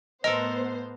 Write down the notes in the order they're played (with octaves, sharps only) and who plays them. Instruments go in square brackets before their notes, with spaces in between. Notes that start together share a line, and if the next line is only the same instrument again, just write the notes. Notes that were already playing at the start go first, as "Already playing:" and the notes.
[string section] A2 B3 C5 [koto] A4 A#4 [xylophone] D#5